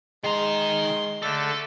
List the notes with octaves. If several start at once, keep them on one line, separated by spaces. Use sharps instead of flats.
D#3 G#3 A#5 C6
D3 A3 A4